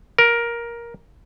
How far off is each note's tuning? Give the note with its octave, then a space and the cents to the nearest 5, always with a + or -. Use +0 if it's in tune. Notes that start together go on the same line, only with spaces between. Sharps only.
A#4 +10